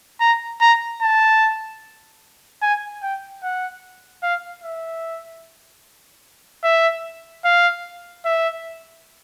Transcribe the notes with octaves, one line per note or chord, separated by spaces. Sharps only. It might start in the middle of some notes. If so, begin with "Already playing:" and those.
A#5
A#5
A5
G#5
G5
F#5
F5
E5
E5
F5
E5